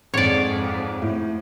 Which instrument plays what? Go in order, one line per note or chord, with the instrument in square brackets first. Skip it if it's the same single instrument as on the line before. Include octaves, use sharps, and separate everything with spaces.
[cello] F2 G#2 [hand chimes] C4 G#4 [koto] C#5 D5
[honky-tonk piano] A2